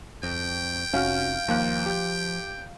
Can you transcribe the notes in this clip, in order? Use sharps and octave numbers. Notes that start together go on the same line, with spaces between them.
F2 G5
F1 C#4 F#4 F5 F6
D#2 F3 A#3 F#6
G4 G6